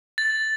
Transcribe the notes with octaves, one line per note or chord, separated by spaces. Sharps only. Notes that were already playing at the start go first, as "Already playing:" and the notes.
A6